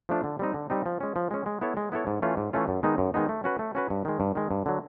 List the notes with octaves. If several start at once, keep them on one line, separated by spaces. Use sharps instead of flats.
F3 A3 D4 F4
D3
G3 C4 D#4
D3
G3 C4 D#4
F3
G#3 C#4
F3
G#3 C#4
G#3
B3 E4 A4 C#5
G#3
B3 E4 A4 C#5
G#2
E3 A3 C#4 F4
G#2
E3 A3 C#4 F4
F#2
D#3 G#3 B3 D#4
F#2
D#3 G#3 B3 D#4
A3
C#4 F#4 B4
A3
C#4 F#4 B4
G2
D#3 G#3
G2
D#3 G#3
G2
D3 F#3